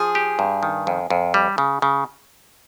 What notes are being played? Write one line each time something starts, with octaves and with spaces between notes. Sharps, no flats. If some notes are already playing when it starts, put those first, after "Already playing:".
Already playing: F3 G#4
G4
G2
D#3
F2
F2
G3
C#3
C#3